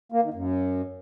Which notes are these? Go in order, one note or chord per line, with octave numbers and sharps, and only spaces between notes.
A#3
D#3
F#2